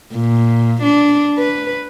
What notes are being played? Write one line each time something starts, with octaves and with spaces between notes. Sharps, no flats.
A#2
D4
B4